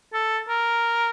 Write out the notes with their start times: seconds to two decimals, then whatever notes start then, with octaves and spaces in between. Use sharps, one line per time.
0.13 A4
0.49 A#4